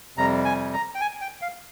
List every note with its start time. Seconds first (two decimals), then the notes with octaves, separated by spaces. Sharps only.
0.17 F2 C3 G3 A#5
0.45 G#5
0.73 A#5
0.95 G5
1.01 G#5
1.21 G5
1.42 F5